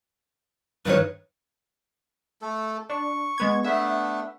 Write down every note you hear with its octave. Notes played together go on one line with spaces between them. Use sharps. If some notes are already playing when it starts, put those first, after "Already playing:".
G2 D#3 B4 C#5
A3 A4
D4 C#6
G#3 B3 G#6
A3 B3 D4 E5